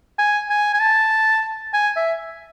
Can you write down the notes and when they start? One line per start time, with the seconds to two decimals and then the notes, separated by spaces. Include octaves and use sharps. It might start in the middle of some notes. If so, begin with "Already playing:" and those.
0.18 G#5
0.49 G#5
0.74 G#5
0.80 A5
1.73 G#5
1.96 E5